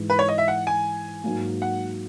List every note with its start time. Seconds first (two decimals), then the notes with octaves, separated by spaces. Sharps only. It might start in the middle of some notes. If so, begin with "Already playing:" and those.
Already playing: G#2 E3 G#3
0.10 B4
0.19 C#5
0.28 D#5
0.38 E5
0.48 F#5
0.67 G#5
1.24 G#2 F#3 A#3
1.62 F#5